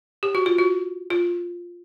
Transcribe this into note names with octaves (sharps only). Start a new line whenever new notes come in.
G4
F#4
F4
F#4
F4